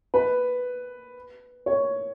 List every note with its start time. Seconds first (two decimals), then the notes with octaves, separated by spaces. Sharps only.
0.14 B4
1.66 C#5